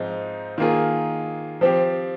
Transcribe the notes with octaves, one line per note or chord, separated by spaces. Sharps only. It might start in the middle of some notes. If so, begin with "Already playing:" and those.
Already playing: G#2 F3 C4 D#4
D#3 A#3 F4 G#4
F3 C4 G4